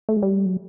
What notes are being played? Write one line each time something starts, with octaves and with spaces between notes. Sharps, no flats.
A3
G#3
G3
F#3